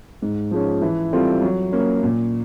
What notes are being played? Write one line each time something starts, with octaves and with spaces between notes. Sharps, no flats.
G#2
F3 G#3 C#4
E3
G3 C4 F4 A4
F#3
A#3 C#4
A#2